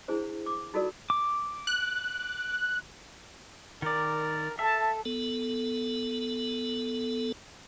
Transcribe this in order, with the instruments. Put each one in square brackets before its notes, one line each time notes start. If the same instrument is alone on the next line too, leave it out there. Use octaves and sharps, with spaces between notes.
[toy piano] D4 E4 G#4 C5
D6
D#4 F4 F#4 A4 A#4 D5
[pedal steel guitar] D6
[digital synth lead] F#6
[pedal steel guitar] D#3 D5 [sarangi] A#4
[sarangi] A4 [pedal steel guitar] E5 [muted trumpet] A5
[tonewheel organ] B3 A4